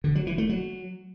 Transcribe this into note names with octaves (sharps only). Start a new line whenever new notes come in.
D3
F#3
E3
A3
F#3